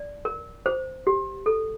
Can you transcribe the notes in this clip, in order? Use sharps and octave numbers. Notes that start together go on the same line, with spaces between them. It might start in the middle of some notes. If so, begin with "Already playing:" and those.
Already playing: D5
A#4
C5
G4
A4